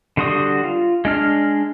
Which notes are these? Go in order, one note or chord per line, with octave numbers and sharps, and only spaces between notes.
D3 G3 F#4 C6 D#6
F4
G#3 D4 F6